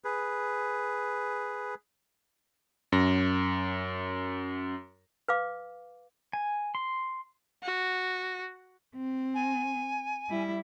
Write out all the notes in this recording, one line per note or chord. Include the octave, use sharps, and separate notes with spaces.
G#4 B4
F#2 A#6
B4 F5 D6
G#5
C6
F#4
C4
G#5
G3 E4